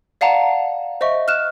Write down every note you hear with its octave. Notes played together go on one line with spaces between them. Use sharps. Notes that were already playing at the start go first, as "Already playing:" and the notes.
D5 F5 F#5 A5 A#5
C5 D#5 E5 C#6
F6 F#6 E7